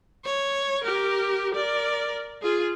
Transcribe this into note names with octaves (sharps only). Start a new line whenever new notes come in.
C#5
G4 A#4
A#4 D5
F4 G#4